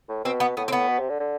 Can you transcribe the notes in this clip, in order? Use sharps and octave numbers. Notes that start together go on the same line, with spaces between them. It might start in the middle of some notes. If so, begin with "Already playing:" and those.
A2
B2 C4
B3
A2 B3
C4
B3
B2
C3
D3
D3